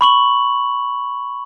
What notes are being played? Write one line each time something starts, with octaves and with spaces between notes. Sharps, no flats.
B5 C#6 F#7